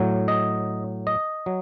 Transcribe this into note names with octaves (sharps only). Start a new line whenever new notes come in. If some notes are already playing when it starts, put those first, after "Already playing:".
Already playing: A2 F#3
D#5
D#5
F#3